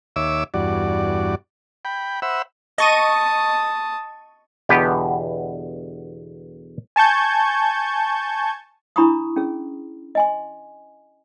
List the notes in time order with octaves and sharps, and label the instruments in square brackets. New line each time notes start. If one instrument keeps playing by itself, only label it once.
[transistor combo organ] D#2 C#5 E5 D6 E6
E2 G2 F#4 D5
G5 B5
C5 E5 F#5 B5 E6
[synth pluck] D#5 C#6 D#7 [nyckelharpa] A5 D#6
[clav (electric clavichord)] E2 B2 D3 B3 G4 B4
[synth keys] G#5 A5 C#6 G6 G#6
[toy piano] D4 E4 A#5 B5 C#6 D#6
C#4 G#4
D#5 G#5 C6